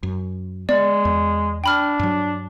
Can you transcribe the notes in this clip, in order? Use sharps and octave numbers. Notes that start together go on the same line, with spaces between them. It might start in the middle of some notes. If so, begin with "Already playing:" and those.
F#2
G#3 B3 D5
E2
D4 G5 B5 F6
G2 F#3